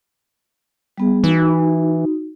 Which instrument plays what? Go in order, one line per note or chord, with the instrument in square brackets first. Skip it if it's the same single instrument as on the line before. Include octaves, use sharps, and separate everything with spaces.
[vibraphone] G3 B3 G#4
[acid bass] E3 [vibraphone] D#4 F#4